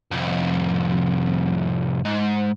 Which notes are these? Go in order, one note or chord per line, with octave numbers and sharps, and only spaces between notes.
C2 F2
G#2